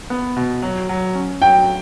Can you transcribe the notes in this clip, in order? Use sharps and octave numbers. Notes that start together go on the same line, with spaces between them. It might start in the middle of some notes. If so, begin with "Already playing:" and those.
B3
B2
F#3
F#3
C#4
F#3 G5